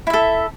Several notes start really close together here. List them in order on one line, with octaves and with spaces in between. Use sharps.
E4 E5 A4